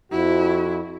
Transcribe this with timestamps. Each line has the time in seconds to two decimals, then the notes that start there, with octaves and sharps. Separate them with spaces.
0.12 F2 E4 F#4